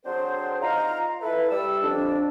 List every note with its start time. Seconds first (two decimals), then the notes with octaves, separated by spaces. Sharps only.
0.05 D3 F#3 C4 D4 G#4 C5
0.62 D#4 F4 F5 A#5
1.22 E4 A4 B4
1.51 G3 E6
1.83 F2 D4